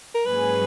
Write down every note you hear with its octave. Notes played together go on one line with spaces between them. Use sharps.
A#4
G#2 F#3 A#3 C#4 G#4 B4